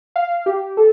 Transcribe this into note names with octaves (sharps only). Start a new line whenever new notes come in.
F5
G4
A4